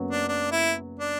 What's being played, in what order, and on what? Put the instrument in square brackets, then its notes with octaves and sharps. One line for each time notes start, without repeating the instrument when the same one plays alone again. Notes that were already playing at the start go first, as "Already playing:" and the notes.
Already playing: [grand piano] F#1 F#2 F#3 B3
[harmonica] D4
D4
E4
D4